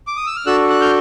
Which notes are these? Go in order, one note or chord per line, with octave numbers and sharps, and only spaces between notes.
D6
D#6
E6
F6
D4 F#4 A4 E6 F#6
F#6
F6 G6